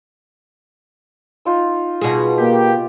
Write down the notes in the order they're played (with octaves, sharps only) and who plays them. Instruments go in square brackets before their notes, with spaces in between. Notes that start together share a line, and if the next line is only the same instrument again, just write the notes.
[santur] D#4 F4 E6
[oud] B2 G#4
[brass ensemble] A#3 G4